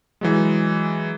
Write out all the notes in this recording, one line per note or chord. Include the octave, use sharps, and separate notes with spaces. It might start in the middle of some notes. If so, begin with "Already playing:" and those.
E3 F#3 G#3